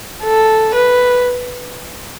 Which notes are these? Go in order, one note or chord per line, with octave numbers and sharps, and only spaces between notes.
A4
B4